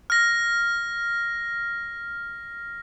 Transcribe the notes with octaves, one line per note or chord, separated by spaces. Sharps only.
F6 A#6